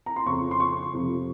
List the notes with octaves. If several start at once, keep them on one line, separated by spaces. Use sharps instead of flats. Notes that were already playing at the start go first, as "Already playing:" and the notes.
A#5
C6
F2 C#3 F3 C#6
C6
C#6
F2 C3 F3